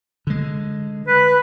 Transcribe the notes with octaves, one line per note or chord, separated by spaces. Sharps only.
D3 G#3
B4